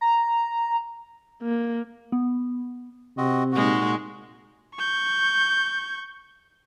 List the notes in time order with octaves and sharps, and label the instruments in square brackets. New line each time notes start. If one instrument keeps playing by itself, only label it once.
[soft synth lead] A#5
[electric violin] A#3
[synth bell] B3
[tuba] C3 [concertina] C4 F#4 D#5
[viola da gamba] A#2 G#3 D#4 [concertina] F#4
[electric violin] C#6 G6